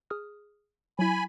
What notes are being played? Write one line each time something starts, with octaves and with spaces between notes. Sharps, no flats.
G#4 D#6 F6
F#3 E4 G#5 B5